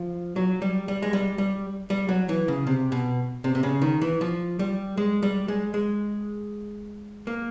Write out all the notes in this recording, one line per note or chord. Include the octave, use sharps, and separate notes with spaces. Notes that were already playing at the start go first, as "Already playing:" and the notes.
Already playing: F3
F#3
G3
G3
G#3
G3
G3
G3
F#3
E3
C#3
C3
B2
C3
C3
C#3
D#3
E3
F3
G3
G#3
G3
G#3
G#3
A#3